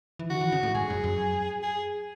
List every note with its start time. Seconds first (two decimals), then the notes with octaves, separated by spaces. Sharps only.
0.19 E3
0.30 D3 F#4
0.41 E3
0.52 C#3
0.63 A2
0.74 G#2 G#4
0.90 F#2
1.04 F#2
1.63 G#4